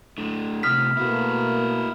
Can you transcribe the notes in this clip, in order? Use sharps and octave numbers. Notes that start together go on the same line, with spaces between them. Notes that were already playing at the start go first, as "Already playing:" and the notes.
A2 D3
A2 C3 D#6 F6 B6
B2 A3 A#3 E4 F#4